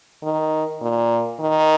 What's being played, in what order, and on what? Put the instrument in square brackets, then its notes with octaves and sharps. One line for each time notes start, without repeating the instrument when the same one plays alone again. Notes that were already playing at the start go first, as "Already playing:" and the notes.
[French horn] D#3
A#2
D#3